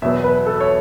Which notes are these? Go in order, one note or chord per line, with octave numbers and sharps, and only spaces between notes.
E2 B2 F#3 B3 E5
B4
A4
C#5